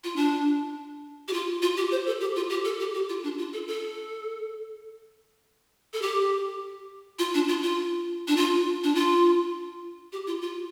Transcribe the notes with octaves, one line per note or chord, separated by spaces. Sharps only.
F4
D4
G4
F4
F4
G4
C5
A4
G4
F4
G4
A4
G4
G4
F4
D4
F4
A4
A4
A4
G4
F4
D4
F4
F4
D4
F4
D4
F4
G4
F4
F4